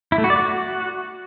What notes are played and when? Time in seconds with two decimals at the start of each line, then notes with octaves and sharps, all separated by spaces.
0.12 E4
0.18 A3
0.24 F#4
0.30 D5
0.36 F#4